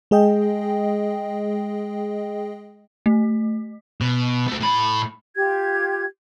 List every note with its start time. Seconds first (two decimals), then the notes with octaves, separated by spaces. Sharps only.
0.11 G#3 G#4 D#5 G5
3.06 A3
4.01 B2
4.48 A3 F#4
4.61 A2 B5
5.36 F4 G4 G#6